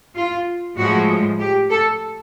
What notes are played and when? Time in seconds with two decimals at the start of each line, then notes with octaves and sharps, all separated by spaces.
0.16 F4
0.78 A2 F3 G#3 F#4
1.40 G4
1.71 A4